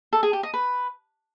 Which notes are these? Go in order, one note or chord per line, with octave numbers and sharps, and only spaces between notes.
A4
G#4
G4
D#5
B4